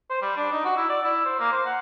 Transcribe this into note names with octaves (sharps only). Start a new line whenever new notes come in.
C5
G3
D4
D#4
F#4
E4
D5
E4
C5
A#3
C5
F#5